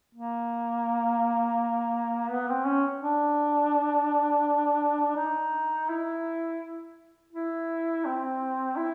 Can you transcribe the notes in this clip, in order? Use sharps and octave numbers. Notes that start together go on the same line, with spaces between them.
A#3
B3
C4
C#4
D4
D#4
E4
E4
C4
E4